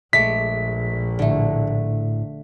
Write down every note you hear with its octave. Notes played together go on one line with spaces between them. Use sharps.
A#1 G#3 A3 D6 B6
A2 D3 A3